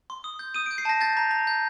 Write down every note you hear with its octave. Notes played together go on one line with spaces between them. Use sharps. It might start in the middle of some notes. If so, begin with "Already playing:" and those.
C6
D#6
G6
D#6 D#7
G6 D7
C7
A5 A#6
G6 A6
A#5
A#5
G6